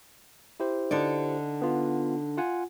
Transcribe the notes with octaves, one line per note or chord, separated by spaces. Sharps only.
E4 G4 C5
D3 D#4 D5
B3 F4
F4 F#5 G#5